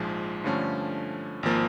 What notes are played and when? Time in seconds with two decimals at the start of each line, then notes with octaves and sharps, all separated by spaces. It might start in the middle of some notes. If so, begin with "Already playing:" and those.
Already playing: A#1 G#2 F3 G#3
0.44 G2 D3 F3 A3 C#4
1.43 G#1 F3 A#3